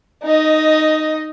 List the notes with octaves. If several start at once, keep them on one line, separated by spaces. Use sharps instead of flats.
D#4 D#5